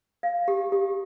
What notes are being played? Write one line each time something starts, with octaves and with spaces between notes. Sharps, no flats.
F5
G4
G4